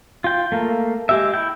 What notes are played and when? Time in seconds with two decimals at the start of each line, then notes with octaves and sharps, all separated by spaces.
0.24 F4 G5
0.52 A3 A#3
1.09 G#3 G4 E5
1.34 E4 G5